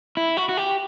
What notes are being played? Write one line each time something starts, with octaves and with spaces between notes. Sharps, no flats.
E4
F#4
F#4
G4